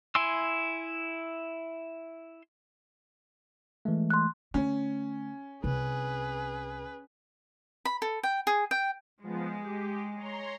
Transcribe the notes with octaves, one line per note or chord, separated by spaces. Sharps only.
E4 G#5 C6 E6
E3 G#3 A3
C6 F#6
D3 A3 C#4
C2 C4 G#4 B4
B5
A4
G5
G#4
G5
F3 G#3 B3
G4
C#5 A#5 C6